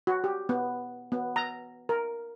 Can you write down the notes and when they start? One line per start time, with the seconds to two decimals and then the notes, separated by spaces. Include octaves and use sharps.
0.07 F#4
0.24 G4
0.49 B3
1.12 B3
1.36 A#5
1.89 A#4